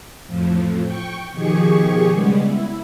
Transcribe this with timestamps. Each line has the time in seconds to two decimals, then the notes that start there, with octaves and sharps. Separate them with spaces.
0.27 F2 A2 F3
0.85 G5 C#6
1.32 B2 D#3 F3 G4 G#4 C#6
2.10 C#3 G3 G#3 B3
2.43 E4